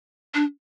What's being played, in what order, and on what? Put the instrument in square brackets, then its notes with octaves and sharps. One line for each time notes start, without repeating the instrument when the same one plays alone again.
[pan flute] D4